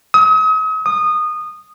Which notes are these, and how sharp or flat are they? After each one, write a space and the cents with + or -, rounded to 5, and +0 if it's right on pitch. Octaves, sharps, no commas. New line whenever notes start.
D#6 +40
D#6 -20